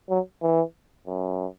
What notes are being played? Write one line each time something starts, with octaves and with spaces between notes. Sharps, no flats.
F#3
E3
F#2